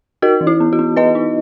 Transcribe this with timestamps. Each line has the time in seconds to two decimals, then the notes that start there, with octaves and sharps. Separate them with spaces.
0.22 D#4 F#4 A#4
0.41 E3
0.47 E4
0.60 B3
0.73 F#4
0.79 B3
0.96 B3 B4 D#5
1.15 D#4